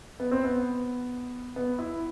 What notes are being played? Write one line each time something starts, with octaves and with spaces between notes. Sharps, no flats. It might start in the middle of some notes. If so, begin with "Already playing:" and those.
B3
C4
B3
B3
E4